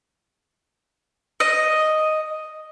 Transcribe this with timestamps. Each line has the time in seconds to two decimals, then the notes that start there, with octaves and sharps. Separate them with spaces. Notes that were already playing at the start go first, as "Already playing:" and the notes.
1.40 D#5